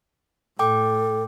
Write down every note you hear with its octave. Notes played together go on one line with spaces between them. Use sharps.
A2 A4 G5 D6